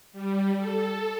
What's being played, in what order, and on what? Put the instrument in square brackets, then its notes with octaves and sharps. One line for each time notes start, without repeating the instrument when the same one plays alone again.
[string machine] G3
A4